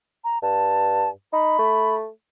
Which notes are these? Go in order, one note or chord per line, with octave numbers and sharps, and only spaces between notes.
A#5
G2 A5
D#4 B5
A3